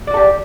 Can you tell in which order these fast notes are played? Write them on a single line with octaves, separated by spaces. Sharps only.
D5 F#4 A4 G4